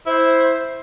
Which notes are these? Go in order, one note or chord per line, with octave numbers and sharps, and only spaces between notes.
E4 C5